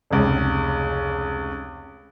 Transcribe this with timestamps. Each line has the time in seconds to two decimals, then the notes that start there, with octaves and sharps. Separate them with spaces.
0.10 F1 C#2